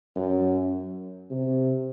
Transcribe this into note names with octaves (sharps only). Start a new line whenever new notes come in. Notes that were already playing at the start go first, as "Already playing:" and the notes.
F#2
C3